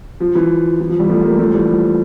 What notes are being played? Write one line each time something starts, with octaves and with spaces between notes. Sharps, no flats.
F3
E3
E3
F3
E3 G3
F3 A3
G3 A#3
F3 A3
E3 G3
F3